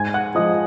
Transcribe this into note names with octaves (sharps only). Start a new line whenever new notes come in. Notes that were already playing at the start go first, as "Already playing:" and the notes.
Already playing: G#2 G#5 G#6
F#5 F#6
F3 G#3 D#5 D#6